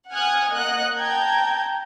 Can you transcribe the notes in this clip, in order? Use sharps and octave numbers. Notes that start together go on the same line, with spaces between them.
F#5 G#5 D#6 F6 F#6 G#6
A#3 D#5 F#5 F#6
G5 A5 A#5 G6 G#6